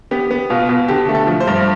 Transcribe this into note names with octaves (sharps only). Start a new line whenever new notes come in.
B3 G4
B3
B2 F4
B2
D3 G4
A3
A4
F3
C5
G2